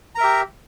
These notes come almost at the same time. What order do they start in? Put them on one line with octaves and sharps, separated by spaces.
A#5 A#4 E5 G4